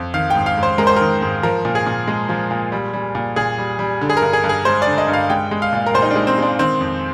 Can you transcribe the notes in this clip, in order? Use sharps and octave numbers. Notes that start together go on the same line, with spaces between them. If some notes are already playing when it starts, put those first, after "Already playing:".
Already playing: F2
D#3 F5
G#2 G5
F5
G#2
C5
G#3 A#4
C5
D#3 A#4
G#2
F3 A#4
A#2
G#4
A#2
G#3
F3
A#2
G3
G3
A#2
A#2 G#4
G3
G3
D3
G#4
A#4
G2
G#4
G2
G#4
G#3 C5
D5
D3
D#5
G2
F5
G#3 G5
G#3
F5
A#2
A#4
A#2 C5
D#4
G#3 D4
C4
G#3 D4
D#3 C4
F2